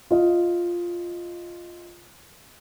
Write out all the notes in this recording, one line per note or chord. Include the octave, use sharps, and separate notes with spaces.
F4 D#5